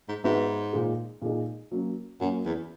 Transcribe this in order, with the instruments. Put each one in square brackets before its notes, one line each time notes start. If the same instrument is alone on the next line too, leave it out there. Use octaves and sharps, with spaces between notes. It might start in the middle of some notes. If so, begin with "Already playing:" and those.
[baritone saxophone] G#2
[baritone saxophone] G#2 [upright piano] B3 F#4 B4 E5
[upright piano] A#2 G#3 D#4 G#4
A#2 G#3 D#4 G#4
F#3 A#3 C#4
[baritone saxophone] F#2 [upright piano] F#3 A#3 C#4
[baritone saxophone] E2